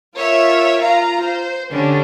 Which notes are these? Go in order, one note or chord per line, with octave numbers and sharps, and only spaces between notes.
F4 A#4 C#5 E5
F4 F5 A#5
C5
D3 G3 C#4 D4